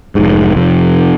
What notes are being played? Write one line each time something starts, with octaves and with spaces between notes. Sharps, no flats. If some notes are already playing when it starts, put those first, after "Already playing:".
F1 G#2
F2 C3